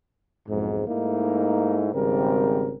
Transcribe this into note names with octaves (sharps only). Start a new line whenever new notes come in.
B1 F2 G#2
G#2 A3 A#3 D#4 E4
G#1 C#3 G3 C4 A#4